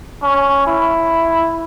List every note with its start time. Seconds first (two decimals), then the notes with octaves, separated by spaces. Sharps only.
0.22 C#4
0.67 E4